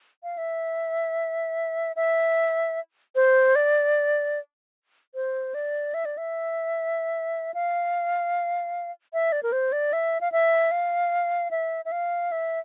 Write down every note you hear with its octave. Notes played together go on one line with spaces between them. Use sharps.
F5
E5
E5
C5
D5
C5
D5
E5
D5
E5
F5
E5
D5
A#4
C5
D5
E5
F5
E5
F5
E5
E5
F5
E5